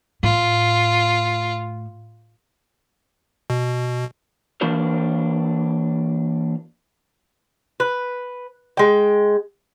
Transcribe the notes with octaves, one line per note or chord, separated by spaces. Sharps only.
A2 F4
B2
E3 A#3 D4 F#4 A#4 C5
B4
G#3 G5